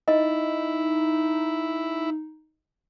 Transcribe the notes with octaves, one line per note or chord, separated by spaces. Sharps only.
D#4 E4 D#5